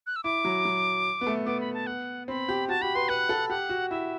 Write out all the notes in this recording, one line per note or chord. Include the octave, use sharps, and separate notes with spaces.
F#6
E6
E4 D6
F#3
F#3
B3
A3
B3 D6
B5
A5
F#5
C4 B5
G4
F#4 A5
G4 B5
B4 C6
B4 F#5
A4
G4 F#5
F#4
E4 E5